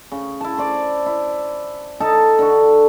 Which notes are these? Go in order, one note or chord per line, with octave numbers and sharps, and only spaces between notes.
C#3
E4 A5
C5 D5 D6
E4
D#4 A4 A5
D3 F#4